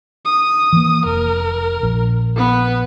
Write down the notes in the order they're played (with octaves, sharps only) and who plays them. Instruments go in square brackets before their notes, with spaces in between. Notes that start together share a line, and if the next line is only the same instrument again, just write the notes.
[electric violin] D#6
[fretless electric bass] E3 F#3 A#3
[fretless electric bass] F1 [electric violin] A#4
[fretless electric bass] A#1
[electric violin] B3 B4